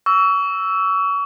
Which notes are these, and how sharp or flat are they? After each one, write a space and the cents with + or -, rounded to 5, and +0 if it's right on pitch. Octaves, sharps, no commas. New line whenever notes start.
C#6 +35 E6 +0